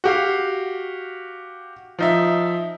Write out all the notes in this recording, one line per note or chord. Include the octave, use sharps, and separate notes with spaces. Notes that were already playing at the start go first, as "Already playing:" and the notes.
F#4 G4 F5
F3 D#4 E5